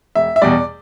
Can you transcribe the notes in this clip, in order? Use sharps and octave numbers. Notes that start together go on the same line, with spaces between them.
E1 E5
E5
E2 B2 G3 D5